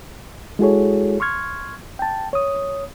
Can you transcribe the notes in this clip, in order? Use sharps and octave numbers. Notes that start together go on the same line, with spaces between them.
G#3 E4 F#4 G#4 A4 C#5
C6 C#6 F6 G#6
G5 A5
C#5 D#6